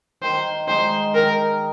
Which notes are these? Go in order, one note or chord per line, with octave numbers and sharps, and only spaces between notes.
D#3 C5
G#3 D#4 C5
D#3 A#4